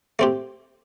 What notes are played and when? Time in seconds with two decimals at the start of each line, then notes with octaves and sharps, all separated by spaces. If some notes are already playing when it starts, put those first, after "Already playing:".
0.19 A3 C4 G4